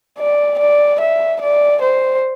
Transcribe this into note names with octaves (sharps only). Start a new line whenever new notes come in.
D5
D5
E5
D5
C5